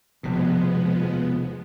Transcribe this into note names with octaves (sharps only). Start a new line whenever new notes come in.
F1 D#2 B2 F3 G#3 B3